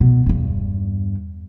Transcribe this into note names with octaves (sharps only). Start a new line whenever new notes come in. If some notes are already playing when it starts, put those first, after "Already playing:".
B2
E2 G2